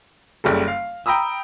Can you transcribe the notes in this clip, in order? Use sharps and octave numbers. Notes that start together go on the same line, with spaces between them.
F#1 C#3 G3 A4
F5
G5 A#5 B5 D#6 E6